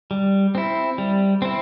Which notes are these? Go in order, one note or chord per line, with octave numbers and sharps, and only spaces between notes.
G3
C4 E4
G3
C4 E4